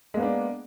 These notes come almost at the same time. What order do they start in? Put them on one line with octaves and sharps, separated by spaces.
G#3 A#3 B3 D4